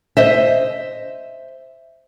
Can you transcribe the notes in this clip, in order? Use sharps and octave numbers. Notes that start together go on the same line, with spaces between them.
C5 D#5 E5